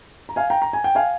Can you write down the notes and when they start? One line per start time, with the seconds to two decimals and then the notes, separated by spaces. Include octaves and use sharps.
0.29 A#5
0.36 F5 G#5
0.50 G5 A#5
0.62 A#5
0.73 G#5
0.84 G5
0.95 F5 G#5